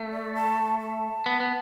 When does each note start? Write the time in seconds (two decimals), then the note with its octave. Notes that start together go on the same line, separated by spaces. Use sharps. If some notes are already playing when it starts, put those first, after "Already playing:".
Already playing: A3
0.13 D5
0.34 A5
0.80 A5
1.26 B3
1.40 B3